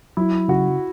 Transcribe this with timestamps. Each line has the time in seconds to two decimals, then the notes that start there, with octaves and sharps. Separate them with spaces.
0.17 F#3 E4
0.48 C#3 F#4